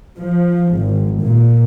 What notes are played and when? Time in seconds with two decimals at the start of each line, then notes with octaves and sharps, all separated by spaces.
0.18 F3
0.78 G#1
1.22 A#2